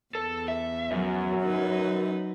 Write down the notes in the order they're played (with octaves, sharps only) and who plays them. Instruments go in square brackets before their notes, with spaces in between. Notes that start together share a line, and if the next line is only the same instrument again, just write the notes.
[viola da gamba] E2 [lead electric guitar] A4
[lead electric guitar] E5
[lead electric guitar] F#2 [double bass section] F#3
[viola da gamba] D#4 B4